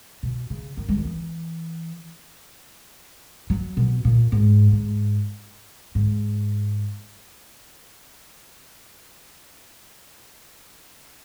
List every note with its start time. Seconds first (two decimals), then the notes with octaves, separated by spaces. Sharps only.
0.23 B2
0.50 C#3
0.77 D#3
0.89 G#3
0.97 F#3
1.05 E3
3.50 F#3
3.77 B2
4.05 A#2
4.32 G#2
4.72 G#2
5.95 G#2